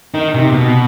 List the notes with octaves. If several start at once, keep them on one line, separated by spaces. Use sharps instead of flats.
D#4 A#4
C3
B2